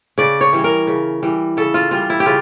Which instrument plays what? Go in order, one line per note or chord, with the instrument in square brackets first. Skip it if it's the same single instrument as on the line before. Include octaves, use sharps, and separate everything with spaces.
[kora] C#3 D5
C#5
E3 G3
A#4
C#3
E3 G3
C#3 A4
F4
E3 G3 F4
E4
G4
C#3 F4